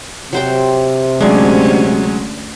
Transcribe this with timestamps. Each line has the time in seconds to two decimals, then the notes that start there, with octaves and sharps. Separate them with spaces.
0.33 C3 F#3 C5 G5
1.21 D2 F#3 G#3 C#4 D4 G#4